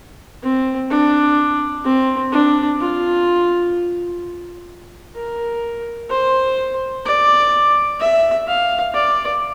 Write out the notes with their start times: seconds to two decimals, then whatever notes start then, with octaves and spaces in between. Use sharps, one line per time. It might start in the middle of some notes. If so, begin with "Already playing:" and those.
0.43 C4
0.90 D4
1.85 C4
2.32 D4
2.80 F4
5.16 A#4
6.10 C5
7.06 D5
8.00 E5
8.47 F5
8.94 D5